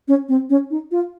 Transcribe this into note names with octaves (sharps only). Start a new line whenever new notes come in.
C#4
C4
C#4
D#4
F4